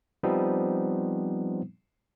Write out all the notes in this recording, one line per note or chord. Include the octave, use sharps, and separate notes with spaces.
F3 G3 B3 C4 D#4